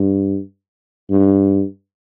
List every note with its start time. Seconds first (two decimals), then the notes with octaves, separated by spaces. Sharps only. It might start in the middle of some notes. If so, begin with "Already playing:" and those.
Already playing: G2
1.10 G2